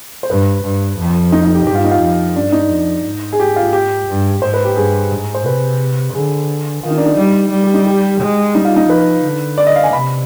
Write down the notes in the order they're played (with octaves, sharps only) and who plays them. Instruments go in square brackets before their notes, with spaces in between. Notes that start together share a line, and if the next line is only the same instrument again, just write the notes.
[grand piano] C5
[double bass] G2 [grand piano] B4
[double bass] G2
F2
[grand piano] D#4
D#4
G4
[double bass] G2 [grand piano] G4
[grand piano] F4
D#4
F4
[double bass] F2
[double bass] G2 [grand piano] D4
[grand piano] D#4
[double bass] F2
G#2
[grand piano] G#4
G4
F4
G4
[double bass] G2
[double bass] G#2 [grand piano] C5
[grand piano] B4
G4
[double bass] G2 [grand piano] G#4
[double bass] G#2
[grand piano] C5
[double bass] C3 [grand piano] B4
[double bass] D3 [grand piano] G#4
[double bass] D#3 [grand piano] F4
[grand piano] D#4
D4
D#4
[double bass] G3
G3
[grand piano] G4
D#4
G4
[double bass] G#3
[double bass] G3 [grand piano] D#4
[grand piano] F4
D#4
[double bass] F3 [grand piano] B4
[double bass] D3
[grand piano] D5
D#5
F5
G#5
[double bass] C3 [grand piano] B5